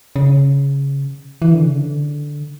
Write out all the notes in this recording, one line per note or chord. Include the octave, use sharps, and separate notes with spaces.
C#3
E3
D3
C#3
D3